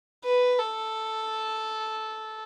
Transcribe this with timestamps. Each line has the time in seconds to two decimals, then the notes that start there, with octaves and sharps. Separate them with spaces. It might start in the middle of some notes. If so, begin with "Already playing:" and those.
0.25 B4
0.59 A4